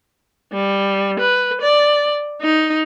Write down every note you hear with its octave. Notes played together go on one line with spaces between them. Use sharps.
G3
B4
D5
D#4